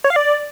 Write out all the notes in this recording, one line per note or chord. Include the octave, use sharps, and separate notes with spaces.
C#5
F5
D5